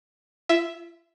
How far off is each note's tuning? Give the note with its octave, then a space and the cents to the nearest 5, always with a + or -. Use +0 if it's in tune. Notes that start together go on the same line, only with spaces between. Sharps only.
F4 -40 E5 +0